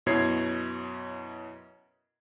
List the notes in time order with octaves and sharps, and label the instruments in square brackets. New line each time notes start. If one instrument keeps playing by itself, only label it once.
[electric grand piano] F#2 B2 E4 C#5 G#6 C7